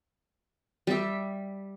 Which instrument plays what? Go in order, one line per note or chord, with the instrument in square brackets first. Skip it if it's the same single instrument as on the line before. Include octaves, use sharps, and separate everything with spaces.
[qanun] G3 E5